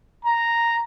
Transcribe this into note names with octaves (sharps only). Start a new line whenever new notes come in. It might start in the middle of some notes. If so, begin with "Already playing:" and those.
A#5